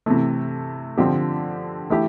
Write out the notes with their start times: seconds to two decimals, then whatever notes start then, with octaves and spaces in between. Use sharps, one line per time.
0.06 C3 E3 A3
0.98 D3 F3 C4 G4
1.90 E3 A3 E4 G4